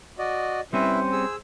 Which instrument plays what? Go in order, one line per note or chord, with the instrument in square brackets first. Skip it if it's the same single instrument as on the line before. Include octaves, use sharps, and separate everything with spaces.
[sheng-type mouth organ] F#4 D5 D#5
[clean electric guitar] G3 C4 C#4 [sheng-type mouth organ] E4 B4 E5 [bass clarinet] C5
[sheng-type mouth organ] G#4 E6